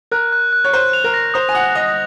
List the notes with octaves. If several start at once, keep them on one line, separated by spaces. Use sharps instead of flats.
A#4 F#6
F#6
F#6
C#5
C5 F#6
F7
A#4
A#6
C5 D#6
G#5
F#5 D#6
D#5 D#6